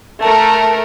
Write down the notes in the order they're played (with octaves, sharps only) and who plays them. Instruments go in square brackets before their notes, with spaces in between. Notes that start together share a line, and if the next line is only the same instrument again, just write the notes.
[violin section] A3 A#4 [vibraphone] A5